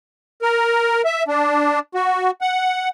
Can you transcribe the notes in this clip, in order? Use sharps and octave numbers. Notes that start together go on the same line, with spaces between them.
A#4
E5
D4
F#4
F#5